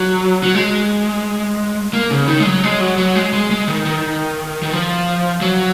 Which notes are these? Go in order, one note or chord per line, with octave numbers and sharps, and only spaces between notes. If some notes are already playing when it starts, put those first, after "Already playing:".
Already playing: F#3
F#3
G#3
A#3
C#3
D#3
G#3
F#3
G#3
F#3
F#3
G#3
G#3
G#3
D#3
D#3
D#3
F3
F#3